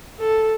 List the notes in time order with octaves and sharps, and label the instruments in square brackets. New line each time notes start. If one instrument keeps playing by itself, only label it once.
[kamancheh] A4